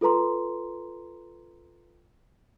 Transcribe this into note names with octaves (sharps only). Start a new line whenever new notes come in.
F4 A4 B4 A#5 C6